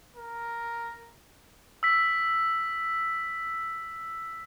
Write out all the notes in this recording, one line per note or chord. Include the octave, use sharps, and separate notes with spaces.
A#4
E6 B6